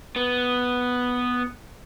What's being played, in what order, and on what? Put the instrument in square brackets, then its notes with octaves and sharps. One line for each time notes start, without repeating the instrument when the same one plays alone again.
[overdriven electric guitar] B3